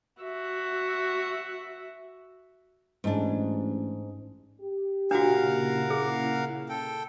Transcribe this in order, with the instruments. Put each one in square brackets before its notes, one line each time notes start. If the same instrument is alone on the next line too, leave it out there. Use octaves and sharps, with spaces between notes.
[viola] F#4 E5
[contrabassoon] A1 [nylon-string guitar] G#2 D4
[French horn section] G4
[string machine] A#2 C#3 E4 [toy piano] D4 F#4 [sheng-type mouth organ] A#4 F5 F#5
[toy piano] G#4
[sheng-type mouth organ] A4 G5